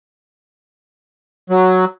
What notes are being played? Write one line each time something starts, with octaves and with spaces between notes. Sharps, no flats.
F#3